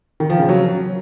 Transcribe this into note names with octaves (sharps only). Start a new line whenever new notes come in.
D#3
F3
C#3
F#3